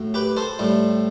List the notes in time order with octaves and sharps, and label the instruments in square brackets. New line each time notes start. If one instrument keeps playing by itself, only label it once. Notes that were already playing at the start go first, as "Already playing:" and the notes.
Already playing: [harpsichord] A2 F#3
G4 B4
A4 C5
A2 G3